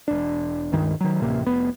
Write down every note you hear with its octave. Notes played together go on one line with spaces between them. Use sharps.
E1 D4
C#2 G2 D#3
D#3 F#3
D1 A1 C3 A#3
F1 B3